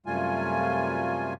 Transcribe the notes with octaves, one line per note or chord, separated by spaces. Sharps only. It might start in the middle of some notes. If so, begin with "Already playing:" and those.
F#2 C3 G3 A3 F4 G#5